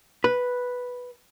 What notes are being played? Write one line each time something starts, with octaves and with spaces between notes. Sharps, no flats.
B4